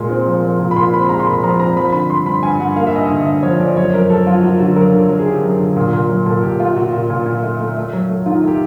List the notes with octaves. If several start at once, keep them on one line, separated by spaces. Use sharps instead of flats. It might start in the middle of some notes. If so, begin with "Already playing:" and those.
Already playing: A#2 G#3
C4
F3
F3
A#2
B5
A#2 C6
C4 B5
B5
G#3 A#5
C6
A#2 B5
F3 A#5
C4 A#5
F3 B5
D3 B5
G2 C6
G2 B5
G2 G#5
G2 F#5
A#3 F5
E5
G2 D#5
D3 E5
G2 E5
F3 C#5
F3 D5
F#2 C#5
F#2 A#4
F#3 A4
F#2 F4
F#2 F#4
D3 F#4
F#3 A#4
D3 A#4
F#3
G#4
D3 G4
F#2
D3
A#2
A#2
F#3
A#2 A4
A#2 G4
A3 F4
A#2 F#4
A#2
A#2
A#2
A3
A3
A3
F#3
A3
D#3 F4
A3 G4